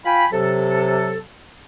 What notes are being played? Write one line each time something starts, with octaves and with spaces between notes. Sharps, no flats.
F4 G5 G#5 B5
C3 F#3 A4